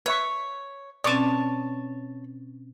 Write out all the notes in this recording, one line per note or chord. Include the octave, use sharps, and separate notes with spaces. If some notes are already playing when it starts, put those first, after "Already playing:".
B4 C#5 E5 C#6
B2 C4 C#4 C#5 D5 A5 C#6 D6